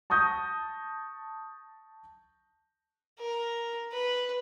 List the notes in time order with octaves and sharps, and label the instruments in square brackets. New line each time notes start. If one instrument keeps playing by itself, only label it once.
[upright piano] A5 C#6 D#6 G6 A#6
[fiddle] A#4
B4